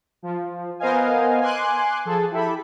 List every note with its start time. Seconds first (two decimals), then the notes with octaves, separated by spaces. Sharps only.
0.22 F3
0.79 B3 A#4 C5 D#5 F5 G#5
1.41 G#5 C6 D6 F#6
2.05 F3 G#4 A4
2.31 E4 G4 A4 E5 B5